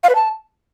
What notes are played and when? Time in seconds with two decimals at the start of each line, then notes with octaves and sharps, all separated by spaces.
0.03 F5
0.09 B4
0.15 A5